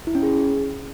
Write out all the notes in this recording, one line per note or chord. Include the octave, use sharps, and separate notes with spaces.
E4
C#4
G#4